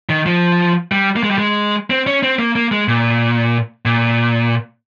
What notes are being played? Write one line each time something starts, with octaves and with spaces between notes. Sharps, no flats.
D#3
F3
G3
A#3
G#3
G3
G#3
C4
C#4
C4
A#3
A#3
G#3
A#2
A#2